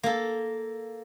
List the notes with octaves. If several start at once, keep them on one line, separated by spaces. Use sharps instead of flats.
A#3 A4